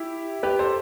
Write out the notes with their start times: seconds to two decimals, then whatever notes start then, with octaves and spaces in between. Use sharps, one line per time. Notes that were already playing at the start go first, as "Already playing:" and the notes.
Already playing: E4 G4
0.43 G4 B4
0.59 A4 C5